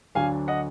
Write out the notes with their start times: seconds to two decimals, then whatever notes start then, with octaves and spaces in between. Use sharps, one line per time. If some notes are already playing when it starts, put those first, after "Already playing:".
0.15 D2 D3 F#3 D4 F5 G#5
0.48 D#5 F#5